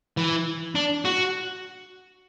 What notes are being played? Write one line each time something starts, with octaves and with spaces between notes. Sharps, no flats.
E3
D4
F#4